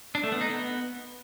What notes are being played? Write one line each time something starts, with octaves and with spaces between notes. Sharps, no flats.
D4
A3
B3
D#4
B3